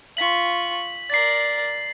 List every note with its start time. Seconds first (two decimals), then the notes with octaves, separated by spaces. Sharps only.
0.17 F4 C#6 B6 F#7
1.10 A#4 D5 A6 C7